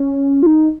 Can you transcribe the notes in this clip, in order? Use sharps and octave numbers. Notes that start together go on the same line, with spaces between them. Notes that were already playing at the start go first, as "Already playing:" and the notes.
Already playing: C#4
F4
D#4